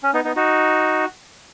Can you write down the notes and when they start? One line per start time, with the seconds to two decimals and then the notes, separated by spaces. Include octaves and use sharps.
0.03 C#4
0.14 B3 D#4
0.24 B3 D#4
0.36 D#4 F#4